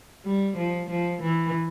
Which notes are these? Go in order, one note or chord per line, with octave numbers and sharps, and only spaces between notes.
G3
F3
F3
E3